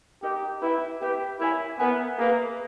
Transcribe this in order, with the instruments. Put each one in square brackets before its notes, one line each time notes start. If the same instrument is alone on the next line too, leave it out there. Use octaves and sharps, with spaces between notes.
[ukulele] D#4 A#4 D#5 [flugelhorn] G4
[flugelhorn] E4 [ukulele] B4 E5 G5
[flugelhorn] G4 [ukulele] B4 E5 G5
[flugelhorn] E4 [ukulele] A#4 C#5 E5 G#5
[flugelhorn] B3 [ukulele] A#4 C#5 E5 G#5
[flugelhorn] A#3 [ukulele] G#4 B4 E5